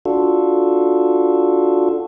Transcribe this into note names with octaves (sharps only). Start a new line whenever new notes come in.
D4 F4 F#4 A4